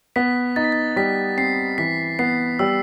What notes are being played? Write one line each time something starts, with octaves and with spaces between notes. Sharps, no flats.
B3 B6
D#4 A6
B6
A6
G3 B6
C4 C7
E3 B6
B3 C7
G3 E6